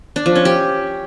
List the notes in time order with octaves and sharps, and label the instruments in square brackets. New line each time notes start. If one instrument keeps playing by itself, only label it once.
[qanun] D4
F3
C#4
G4